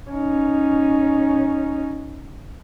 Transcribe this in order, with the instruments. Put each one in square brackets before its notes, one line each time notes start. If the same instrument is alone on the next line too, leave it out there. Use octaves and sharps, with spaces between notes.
[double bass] C#4 D#4